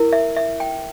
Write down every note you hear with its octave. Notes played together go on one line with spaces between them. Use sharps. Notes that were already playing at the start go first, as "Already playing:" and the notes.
Already playing: E4 A#4
E5
E5
G5